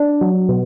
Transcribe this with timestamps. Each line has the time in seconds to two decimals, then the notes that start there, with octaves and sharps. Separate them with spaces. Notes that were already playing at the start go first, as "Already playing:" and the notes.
Already playing: D4
0.21 F#3
0.49 B2